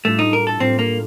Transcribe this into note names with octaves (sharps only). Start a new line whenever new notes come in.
A2 G3 A3 D4 F4
D#4
A#4
A4
A2 G3 C4 D4 F4
A#3